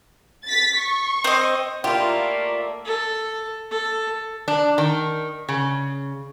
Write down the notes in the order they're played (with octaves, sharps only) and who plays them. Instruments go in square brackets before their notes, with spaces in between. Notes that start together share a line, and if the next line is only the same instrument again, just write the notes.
[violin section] A6 B6
C#6
[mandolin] C4 D#5
[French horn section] A3 A#3 [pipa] E4 G4 [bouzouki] F4 [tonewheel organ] D5 E5
[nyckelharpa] A4
A4
[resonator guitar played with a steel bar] D4
D#3
C#3